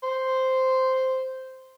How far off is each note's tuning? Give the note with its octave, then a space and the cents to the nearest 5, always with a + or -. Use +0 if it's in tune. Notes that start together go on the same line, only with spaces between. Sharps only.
C5 -5